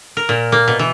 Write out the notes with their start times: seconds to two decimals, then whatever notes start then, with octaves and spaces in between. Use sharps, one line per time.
0.17 A#4
0.29 A#2
0.52 A#3
0.68 B2
0.79 E3